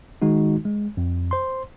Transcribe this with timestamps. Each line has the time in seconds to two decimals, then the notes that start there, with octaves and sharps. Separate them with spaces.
0.22 D#3 G#3 D#4 F#4
0.65 G#3
0.97 F2
1.31 C5 C6